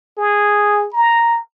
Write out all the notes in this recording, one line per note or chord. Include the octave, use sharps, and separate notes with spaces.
G#4
A#5